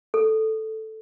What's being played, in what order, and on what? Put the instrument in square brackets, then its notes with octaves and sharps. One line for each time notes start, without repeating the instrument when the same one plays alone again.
[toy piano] A4